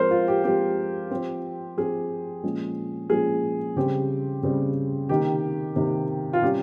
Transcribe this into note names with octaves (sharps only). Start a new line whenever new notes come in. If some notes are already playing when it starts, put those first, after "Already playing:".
Already playing: F3 G#3 C4 A#4 C5
F4
G4
F3 G#3 C4 G4
F3 C4
F3 C4 G#4
A#2 F3 G#3 C#4
A#2 F3 G#3 C#4 G#4
C#3 G3 C4 G4
C#3 G3 C4
C3 D#3 A#3 G4
C3 D#3 A#3
F4
C3 G3 C#4 G4